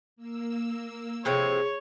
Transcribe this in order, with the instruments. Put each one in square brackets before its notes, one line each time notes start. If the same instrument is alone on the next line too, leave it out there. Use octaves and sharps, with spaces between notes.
[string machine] A#3 E6
[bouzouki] A2 C3 F3 [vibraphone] G#4 [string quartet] C#5